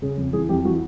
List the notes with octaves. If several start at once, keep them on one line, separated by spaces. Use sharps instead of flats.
C#3 G#4
F2
E3 G#4
F2 G4
E3 F#4